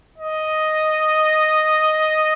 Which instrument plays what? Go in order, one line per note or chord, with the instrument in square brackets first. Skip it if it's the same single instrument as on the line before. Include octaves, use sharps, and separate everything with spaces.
[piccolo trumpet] D#5